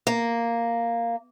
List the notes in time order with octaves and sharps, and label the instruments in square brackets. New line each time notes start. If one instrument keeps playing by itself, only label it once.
[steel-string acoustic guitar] A#3